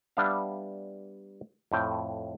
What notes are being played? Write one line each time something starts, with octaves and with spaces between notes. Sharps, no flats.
G3 B3 D4 E5 F5
F2 A2 G5